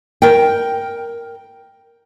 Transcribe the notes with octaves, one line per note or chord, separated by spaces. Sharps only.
A#4 G5